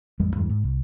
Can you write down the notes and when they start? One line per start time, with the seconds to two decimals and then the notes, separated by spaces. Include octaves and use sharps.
0.20 A1 F2 G3 G#3
0.36 E2 G2 E3 G#3
0.50 G#2
0.64 C2